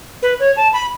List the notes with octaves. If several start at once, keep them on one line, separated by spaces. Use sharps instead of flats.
B4
C#5
A5
B5